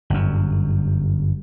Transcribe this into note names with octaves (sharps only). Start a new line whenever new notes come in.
G1 F#2